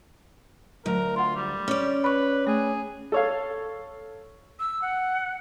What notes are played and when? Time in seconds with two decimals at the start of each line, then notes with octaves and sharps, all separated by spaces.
0.86 D2 F#3 A#4
1.16 F4 F#5 C6
1.36 G3
1.68 C#4 D5
2.04 B4 B5 C#6
2.47 A3 G#4
3.12 A4 C#5 F5
4.59 E6
4.82 F#5